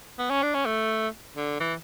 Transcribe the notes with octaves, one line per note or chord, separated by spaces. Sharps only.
B3
C#4
D4
C#4
A3
D3
E3